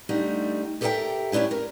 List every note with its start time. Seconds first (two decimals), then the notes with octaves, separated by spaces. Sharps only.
0.09 D3 G3 A3 D#4
0.81 G4 A4 A#4 D#5 E5 G5
1.32 A3 C#4 D4 E4 G4
1.51 A#4